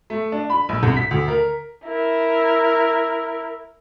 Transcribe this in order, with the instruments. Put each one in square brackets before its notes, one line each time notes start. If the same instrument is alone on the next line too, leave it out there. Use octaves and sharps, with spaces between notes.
[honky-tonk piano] A3
D4
B5
A#1
C2
B6
D2
A#4
[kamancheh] E4 A#4